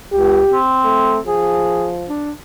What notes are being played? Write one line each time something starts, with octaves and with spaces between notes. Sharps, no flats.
C#2 G4
C4
A3
F3 G#4
D4